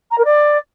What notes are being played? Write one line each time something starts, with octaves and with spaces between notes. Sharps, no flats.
A#5
A#4
D5